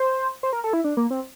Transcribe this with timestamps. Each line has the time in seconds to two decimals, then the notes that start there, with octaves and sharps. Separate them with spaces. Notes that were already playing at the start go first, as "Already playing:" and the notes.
Already playing: C5
0.43 C5
0.53 A#4
0.64 A4
0.73 E4
0.84 D4
0.97 A#3
1.10 C4